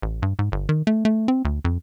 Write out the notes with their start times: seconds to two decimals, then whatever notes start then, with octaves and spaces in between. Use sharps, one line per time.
0.02 A1
0.22 G2
0.39 G#2
0.52 G1
0.69 D#3
0.87 A3
1.05 A3
1.28 C4
1.45 D2
1.65 F2